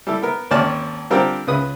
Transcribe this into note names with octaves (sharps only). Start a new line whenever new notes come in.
G3 E4 A4
B3 A#4
G#1 D#2 C#4 D5 A5 F6
D3 G3 C4 F4 G4 A#4
C#2 C#3 B4 D#6